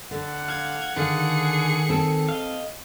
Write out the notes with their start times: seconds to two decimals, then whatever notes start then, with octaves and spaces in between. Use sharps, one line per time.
0.11 D3 F#5
0.48 F5 G#6
0.96 D3 D#3 G#4 F5 F6 C#7
1.89 C4 A4
2.29 D#5 F5